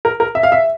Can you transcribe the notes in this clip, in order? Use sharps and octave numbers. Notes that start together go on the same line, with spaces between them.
A#4
A#4
E5
F5
E5